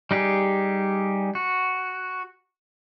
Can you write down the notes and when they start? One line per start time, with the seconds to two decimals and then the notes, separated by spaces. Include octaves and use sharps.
0.11 G3 D#4 G4 G#4
1.35 F#4